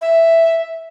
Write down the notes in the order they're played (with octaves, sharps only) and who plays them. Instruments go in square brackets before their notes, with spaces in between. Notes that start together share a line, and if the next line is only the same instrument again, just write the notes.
[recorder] E5